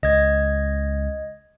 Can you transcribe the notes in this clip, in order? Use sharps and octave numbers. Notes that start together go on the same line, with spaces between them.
C#2 D#5 G#6